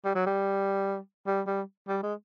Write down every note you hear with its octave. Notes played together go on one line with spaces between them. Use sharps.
G3
F#3
G3
G3
G3
G3
G#3